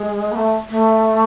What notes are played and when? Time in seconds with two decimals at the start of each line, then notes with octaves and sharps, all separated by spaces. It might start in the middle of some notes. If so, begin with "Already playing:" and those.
Already playing: G#3
0.32 B3
0.36 A3
0.70 A3